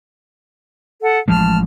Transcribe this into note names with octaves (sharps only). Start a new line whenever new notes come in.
A4 F#5
A1 F3 G#3 A5 F6